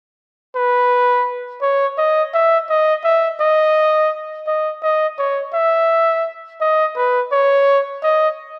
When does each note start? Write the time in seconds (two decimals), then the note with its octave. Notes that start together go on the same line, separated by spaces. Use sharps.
0.56 B4
1.62 C#5
1.98 D#5
2.33 E5
2.69 D#5
3.04 E5
3.40 D#5
4.47 D#5
4.82 D#5
5.18 C#5
5.53 E5
6.60 D#5
6.96 B4
7.32 C#5
8.03 D#5